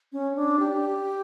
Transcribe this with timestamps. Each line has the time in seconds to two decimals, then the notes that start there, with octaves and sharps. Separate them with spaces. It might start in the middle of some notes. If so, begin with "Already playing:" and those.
0.12 C#4
0.36 D4
0.59 G4